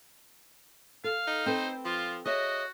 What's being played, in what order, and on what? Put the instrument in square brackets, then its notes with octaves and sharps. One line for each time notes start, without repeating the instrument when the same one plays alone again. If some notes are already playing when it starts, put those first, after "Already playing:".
[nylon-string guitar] A4 [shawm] F5
[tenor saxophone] D#4
[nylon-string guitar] C4 A4 B4 [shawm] C5
[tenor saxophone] F3 [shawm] F4
[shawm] F#4 [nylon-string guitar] G#4 C#5 E5 [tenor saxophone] D#5